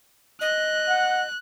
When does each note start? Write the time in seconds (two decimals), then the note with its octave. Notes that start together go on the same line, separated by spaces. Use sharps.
0.41 D#5 F#6
0.89 F#5